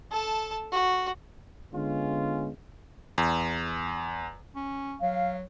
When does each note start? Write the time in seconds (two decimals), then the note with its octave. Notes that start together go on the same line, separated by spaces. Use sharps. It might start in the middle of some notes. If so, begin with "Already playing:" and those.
0.11 A4 A5
0.72 F#4
1.74 D3 G#3 B3 C#4 F4
3.18 E2
4.55 C#4
5.02 F#3 F5